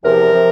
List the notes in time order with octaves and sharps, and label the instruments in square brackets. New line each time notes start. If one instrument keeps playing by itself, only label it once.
[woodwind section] E2 C3 F3 A#4
C3 F3